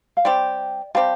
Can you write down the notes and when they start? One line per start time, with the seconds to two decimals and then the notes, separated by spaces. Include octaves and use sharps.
0.17 F5
0.25 G3 C4 G4 D5 G5
0.95 G3 C4 G4 F5 A5